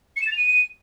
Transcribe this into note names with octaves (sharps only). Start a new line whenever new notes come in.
C#7
E7
A6
F7
D#7